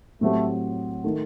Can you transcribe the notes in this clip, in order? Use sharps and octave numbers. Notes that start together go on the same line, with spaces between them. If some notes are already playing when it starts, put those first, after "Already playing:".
A2 F#3 A3 C4 G4
D#3 A3